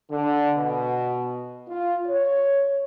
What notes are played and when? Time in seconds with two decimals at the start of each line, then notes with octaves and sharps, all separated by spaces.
0.11 D3
0.54 B2
1.68 F4
2.07 C#5